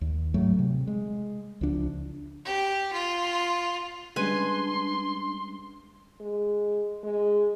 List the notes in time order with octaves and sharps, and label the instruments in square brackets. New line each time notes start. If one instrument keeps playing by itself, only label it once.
[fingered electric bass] D#2
G#2 F#3 A3
C3
G#3
C#2 F3 D4
[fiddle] G4
F4
[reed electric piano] G3 G#3 C#4 [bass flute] D4 [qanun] B4 G#5 [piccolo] C6
[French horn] G#3
G#3